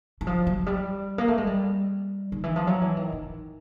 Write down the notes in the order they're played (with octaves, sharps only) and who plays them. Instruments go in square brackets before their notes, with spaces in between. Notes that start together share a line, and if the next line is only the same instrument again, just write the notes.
[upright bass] E3
F3
F#3
G3
A#3
A3
G#3
G3
D#3
E3
F3
F#3
E3
D#3
D#3